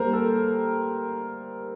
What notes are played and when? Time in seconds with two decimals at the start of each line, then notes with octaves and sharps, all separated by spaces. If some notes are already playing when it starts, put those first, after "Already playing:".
Already playing: G3 A#3 A#4 C5
0.13 A4